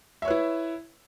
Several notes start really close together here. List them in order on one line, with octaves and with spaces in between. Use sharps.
E5 C#5 B4 E4